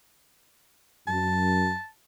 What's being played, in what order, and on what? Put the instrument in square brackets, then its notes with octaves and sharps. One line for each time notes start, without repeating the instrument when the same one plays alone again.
[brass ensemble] F#2 [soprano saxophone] A5